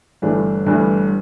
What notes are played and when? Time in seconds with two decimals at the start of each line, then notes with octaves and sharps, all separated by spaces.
0.22 G1 G2 E3 A3 D4
0.66 G1 G2 E3 A3 D4